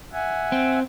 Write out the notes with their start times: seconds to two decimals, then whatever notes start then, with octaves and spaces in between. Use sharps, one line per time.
0.13 E5 F#5 G#5
0.52 C4